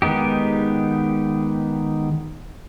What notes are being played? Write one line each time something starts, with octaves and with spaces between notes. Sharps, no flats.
D#3 G#3 B3 D#4 G4